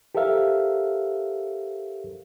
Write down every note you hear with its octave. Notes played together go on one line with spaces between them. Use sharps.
G4 A4 A#4 C5 E5 F5